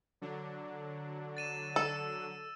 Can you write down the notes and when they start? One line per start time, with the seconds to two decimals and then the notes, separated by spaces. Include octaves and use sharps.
0.21 D3 F#3 D4
1.37 A6 D#7 E7
1.76 A4 E6